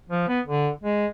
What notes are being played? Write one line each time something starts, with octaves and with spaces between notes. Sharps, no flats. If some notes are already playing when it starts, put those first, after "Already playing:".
F3
B3
D3
G#3